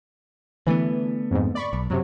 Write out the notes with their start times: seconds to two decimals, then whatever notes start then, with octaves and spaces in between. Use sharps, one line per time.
0.67 D3 E3 A3 B3
1.31 F2 G#2
1.55 D5 B5 C#6
1.73 B1
1.90 F#2 C3 F#3